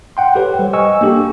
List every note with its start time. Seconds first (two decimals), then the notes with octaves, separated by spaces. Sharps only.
0.17 F#5 G5 C6
0.35 G4 A4 B4 C#5
0.59 G3 C5
0.73 D#5 G#5 C#6 E6
1.01 A#3 D4 G4 A4